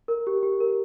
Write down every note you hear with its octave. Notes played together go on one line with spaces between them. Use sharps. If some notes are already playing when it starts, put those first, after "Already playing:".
A#4
G4
G4
A#4